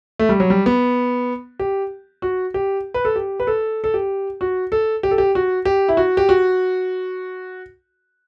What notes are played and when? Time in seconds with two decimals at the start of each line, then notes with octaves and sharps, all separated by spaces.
0.19 A3
0.29 G3
0.40 F#3
0.50 G3
0.66 B3
1.59 G4
2.22 F#4
2.54 G4
2.94 B4
3.05 A4
3.16 G4
3.40 B4
3.47 A4
3.84 A4
3.94 G4
4.41 F#4
4.72 A4
5.03 G4
5.11 A4
5.18 G4
5.35 F#4
5.65 G4
5.88 E4
5.97 F#4
6.17 G4
6.29 F#4